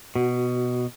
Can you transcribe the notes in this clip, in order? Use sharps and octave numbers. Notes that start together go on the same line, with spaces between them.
B2 F#4